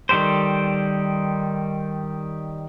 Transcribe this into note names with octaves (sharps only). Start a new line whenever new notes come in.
D#3 G3 G4 A4 C5